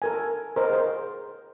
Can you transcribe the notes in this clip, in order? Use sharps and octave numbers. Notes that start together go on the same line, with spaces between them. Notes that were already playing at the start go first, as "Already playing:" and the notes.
A4 A#4 G#5
A#4 C5 D#5
G#4 C5